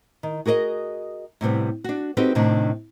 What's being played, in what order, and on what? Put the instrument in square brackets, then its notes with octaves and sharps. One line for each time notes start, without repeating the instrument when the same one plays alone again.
[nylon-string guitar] D#3
F#4 G#4 A#4 D5 D#5
A2 C3 G3 B3
D4 F#4
C4 D#4 F#4 G4 A4 B4
A2 C3 D#3 D4 D#4